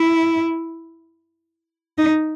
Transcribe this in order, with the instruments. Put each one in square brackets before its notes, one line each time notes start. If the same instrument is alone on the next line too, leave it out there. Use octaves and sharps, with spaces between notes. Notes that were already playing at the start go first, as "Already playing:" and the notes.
Already playing: [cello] E4
D#4